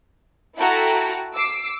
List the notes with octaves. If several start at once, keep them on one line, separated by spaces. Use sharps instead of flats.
E4 F#4 A4 G5 A5 A#5
D6 E6 C7